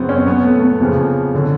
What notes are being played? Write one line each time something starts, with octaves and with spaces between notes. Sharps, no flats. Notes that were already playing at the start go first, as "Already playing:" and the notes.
Already playing: F#2 C#3 F#3 B3 C4
C#4
A#2 F#3 B3
A3
B3
F2 C#3 F3
D3 F#3